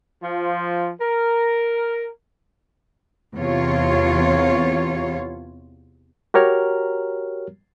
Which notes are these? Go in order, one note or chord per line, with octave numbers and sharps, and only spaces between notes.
F3
A#4
E2 C3 F4 C#5
F#4 G4 A#4 C#5 A#5 F6